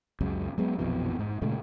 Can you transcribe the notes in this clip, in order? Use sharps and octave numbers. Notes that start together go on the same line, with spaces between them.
C#2 F#2 C#3
F#3 G#3 B3
A#1 F2 B2 E3
G#2
A#2 C#3 G#3 A3